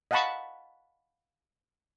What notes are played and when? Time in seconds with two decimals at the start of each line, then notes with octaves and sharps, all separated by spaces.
0.11 D#5 F5 F#5 A5 B5 C#6